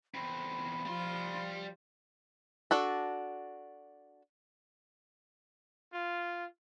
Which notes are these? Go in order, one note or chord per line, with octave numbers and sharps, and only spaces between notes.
E2 C4 B5
F3 G3 F4 C6
D4 F#4 A4
F4